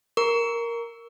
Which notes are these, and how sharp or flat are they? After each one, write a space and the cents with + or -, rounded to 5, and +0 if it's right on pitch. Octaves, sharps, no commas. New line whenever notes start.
A#4 +0 C#6 +30